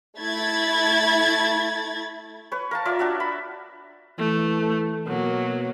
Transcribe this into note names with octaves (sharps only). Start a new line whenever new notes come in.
A3 E4 B5 G#6 A6
B4 C#5
A#4 F5 A5
F4 C#5 D5 E5
D4 F#4 E5
B5
E3 A3
B2 F#3 A#3